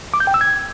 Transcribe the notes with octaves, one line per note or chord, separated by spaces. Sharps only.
D6
G6
G5
E6
G#6